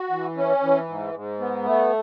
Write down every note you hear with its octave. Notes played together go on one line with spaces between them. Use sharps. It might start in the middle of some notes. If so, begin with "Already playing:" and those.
Already playing: F#4
E3
C#4
E3
G#2
G#2
B3
A3